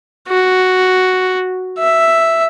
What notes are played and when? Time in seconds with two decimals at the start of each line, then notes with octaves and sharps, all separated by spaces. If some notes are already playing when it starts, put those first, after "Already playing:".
0.28 F#4
1.78 E5